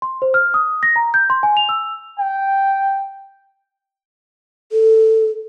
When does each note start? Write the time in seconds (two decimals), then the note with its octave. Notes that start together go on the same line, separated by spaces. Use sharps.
0.02 C6
0.22 C5
0.34 F6
0.54 D#6
0.83 A#6
0.96 A#5
1.14 G6
1.30 C6
1.43 G#5
1.57 F7
1.69 E6
2.20 G5
4.72 A4